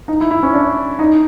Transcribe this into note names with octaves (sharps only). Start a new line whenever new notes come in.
D#4
E4
E4
C#4
D4
D#4